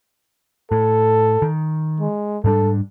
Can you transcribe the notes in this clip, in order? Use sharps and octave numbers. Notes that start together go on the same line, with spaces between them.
A2 A4
D#3
G#3
G#2 G3 D4 A4